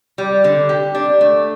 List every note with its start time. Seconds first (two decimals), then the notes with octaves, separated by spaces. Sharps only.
0.18 G3
0.44 D3
0.69 G4
0.95 D4
1.21 A3